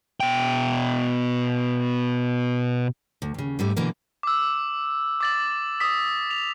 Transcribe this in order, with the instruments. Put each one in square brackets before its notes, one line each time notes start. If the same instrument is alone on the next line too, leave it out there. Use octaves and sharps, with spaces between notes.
[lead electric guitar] B2 G5
[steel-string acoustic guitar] D2
D#2 C#3
G#2 G3 A3
B2 D3 E3 A#3
[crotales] D6 E6
D6 A6 F#7
D#6 B6
F7